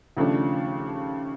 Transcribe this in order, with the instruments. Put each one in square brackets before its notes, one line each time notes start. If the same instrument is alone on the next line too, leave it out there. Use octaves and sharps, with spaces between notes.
[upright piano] D#2 C#3 F3 A3 D4